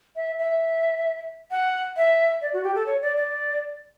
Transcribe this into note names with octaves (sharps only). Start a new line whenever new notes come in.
E5
E5
F#5
E5
D5
F#4
G4
A4
C#5
D5
D5